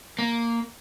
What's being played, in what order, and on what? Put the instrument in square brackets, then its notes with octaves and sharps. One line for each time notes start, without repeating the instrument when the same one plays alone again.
[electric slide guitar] A#3